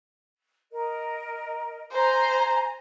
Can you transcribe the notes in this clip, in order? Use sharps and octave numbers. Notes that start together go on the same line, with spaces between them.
A#4 D#5
C5 G#5 A#5